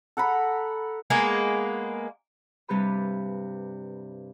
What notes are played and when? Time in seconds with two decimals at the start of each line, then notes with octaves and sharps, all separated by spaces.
0.17 A4 F#5 A#5 B5
1.10 G#3 A#3 B3
2.68 G2 C3 G3 G4 B4 B5